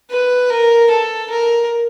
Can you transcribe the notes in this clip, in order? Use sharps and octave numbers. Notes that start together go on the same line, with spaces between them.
B4
A#4
A4
A#4